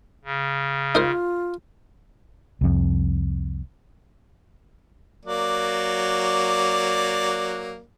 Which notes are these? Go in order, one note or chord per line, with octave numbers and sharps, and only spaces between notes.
C#3
D#4 F4 A#4 C5
C2 F2
F#3 A#3 D5